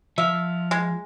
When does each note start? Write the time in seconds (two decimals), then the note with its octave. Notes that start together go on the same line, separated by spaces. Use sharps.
0.18 F3 E5 F5
0.71 G#3